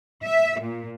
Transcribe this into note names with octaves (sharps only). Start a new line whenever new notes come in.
E5
A#2